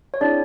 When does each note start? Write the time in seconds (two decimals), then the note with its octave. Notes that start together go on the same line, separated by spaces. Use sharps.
0.14 C#5
0.21 C4 D4 E4 G#4 D5